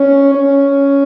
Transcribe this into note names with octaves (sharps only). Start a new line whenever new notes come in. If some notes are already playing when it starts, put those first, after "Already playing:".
Already playing: C#4
C#4